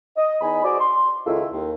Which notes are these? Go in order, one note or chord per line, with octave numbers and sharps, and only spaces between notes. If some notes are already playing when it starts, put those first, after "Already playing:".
D#5
E2 D#4 G#5 B5
F#4 G#4 C5 D5
C6
C#2 D#3 E4 F4 A4
D#2